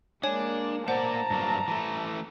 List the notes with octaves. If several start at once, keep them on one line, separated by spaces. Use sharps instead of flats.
G#3 A#3 D4 C#5 G#5
A#3 C5 D5 F#5 A5 A#5
G2 F#3 A#3
E3 A3